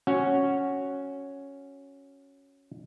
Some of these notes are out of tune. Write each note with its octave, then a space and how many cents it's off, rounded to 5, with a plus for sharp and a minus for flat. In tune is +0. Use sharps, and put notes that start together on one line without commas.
C#4 +0 F#4 +0